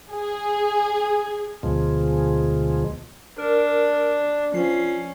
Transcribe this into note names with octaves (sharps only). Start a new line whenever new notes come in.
G#4
D2 B2 F3 G#3
D4 A#4
F3 C#4 C7